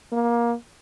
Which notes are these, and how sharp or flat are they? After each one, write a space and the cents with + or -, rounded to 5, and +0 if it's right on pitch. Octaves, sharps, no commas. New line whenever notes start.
A#3 +20